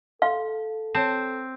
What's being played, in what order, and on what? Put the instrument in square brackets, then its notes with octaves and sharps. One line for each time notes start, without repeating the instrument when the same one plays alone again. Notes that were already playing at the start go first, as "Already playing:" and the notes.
[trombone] A4 [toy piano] F5 [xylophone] C6
[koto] C4 [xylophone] C#5 A5